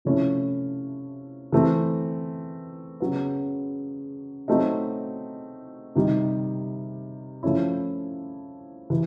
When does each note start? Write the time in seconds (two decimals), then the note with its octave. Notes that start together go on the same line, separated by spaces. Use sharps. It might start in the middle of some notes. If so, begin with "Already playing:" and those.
0.05 C3 F3 A3 C#4 E4
1.52 E3 A3 C4
3.00 C#3 F#3 B3
4.48 F#3 A3 C4 D#4
5.95 C3 D#3 G3
7.43 F3 A3 C#4 E4
8.90 E3